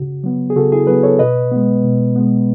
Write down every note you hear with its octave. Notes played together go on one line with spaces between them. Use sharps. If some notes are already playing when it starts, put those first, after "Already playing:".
Already playing: C#3 F#4
F#3 B3
G#4
C#3 F#4 A4
E4 G#4
F#3 B3 G#4 B4
A4 C#5
B2 B4 D#5
G#3 B3
B2
G#3 B3